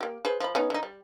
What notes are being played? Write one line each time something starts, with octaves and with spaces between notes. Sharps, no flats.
A#3 G4
G#4 B4 C5
F3 B5
B3 C#4 D#4
D3 D#4
G3